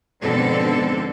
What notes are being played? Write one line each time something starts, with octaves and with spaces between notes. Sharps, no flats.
F2 G#2 B2 D3 C4 A4